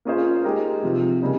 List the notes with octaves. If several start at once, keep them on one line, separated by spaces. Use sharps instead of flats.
A#3 C#4 F4 G#4 C5
G#3 D#4 G4 A#4
C3 F3 C4
C#3 G3 A#3 D#4